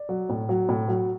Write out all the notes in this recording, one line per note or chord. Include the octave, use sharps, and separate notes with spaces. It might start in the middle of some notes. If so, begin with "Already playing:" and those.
Already playing: D5
F#3
A2
F#3
A2
F#3